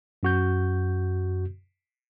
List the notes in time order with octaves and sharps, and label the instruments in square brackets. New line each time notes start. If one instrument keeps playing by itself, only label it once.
[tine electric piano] F#2 F#4 G6